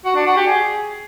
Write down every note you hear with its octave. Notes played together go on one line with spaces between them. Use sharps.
F#4
D4
F#4
G4
G#4